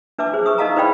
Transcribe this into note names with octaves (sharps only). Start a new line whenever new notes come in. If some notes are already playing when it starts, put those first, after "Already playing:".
D4 B4 E5 A5 D6
G#4 C5
B4 C#6 D#6
D#4 A#4 D#5 F5 A5 A#5
E4 B4 C5 D5 G5 B5